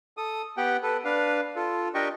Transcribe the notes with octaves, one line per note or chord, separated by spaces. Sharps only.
A4 D#6
B3 G4 F#5 G5
A4 B4
D4 B4 F5
F4 A4
D4 G4 A#4 D#5 G5 C#6